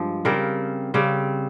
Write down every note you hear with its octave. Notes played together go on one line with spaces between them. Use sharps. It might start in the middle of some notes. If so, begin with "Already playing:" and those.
Already playing: G2 F3 G#3
C#3 G3 C4 A#4
C#3 G3 C4